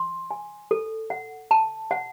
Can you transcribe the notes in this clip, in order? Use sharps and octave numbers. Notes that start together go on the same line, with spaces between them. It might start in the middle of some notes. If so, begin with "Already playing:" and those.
Already playing: C6
G#5
A4
F#5
A5
F#5